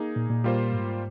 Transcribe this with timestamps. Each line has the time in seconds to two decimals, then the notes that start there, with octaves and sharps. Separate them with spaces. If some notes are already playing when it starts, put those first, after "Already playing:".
Already playing: A#3 D#4 G#4
0.16 A#2
0.30 A#2
0.44 G3 A#3 F4 C5
0.72 G#2